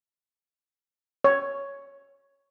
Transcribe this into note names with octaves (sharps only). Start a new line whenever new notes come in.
C#5